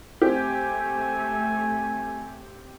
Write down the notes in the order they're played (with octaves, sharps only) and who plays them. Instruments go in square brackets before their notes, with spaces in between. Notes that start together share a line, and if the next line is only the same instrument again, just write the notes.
[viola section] A3 [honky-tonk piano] C4 G4 [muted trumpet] G#5